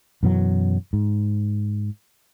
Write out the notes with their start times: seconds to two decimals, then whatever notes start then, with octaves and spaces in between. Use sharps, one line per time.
0.23 F#2 B2 E3 F#3
0.93 G#2